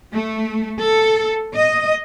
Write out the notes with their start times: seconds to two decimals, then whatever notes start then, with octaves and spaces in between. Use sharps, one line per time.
0.14 A3
0.79 A4
1.54 D#5